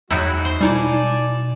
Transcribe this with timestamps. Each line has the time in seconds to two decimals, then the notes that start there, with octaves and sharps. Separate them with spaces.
0.10 E2 F#3 G#3 D#4 E4 F#4
0.45 C5
0.61 B2 G3 D#4 E4 D5 G#5 A5